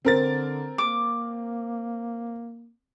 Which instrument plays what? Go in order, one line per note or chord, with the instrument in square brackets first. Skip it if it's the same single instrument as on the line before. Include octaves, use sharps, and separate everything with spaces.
[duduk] D3 [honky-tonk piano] C4 A#4 A6
[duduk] A#3 [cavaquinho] D6